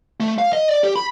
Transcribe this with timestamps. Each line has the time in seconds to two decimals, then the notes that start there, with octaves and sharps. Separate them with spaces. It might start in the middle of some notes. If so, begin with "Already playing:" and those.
0.20 A3
0.38 F5
0.53 D#5
0.69 D5
0.84 G4
0.96 B5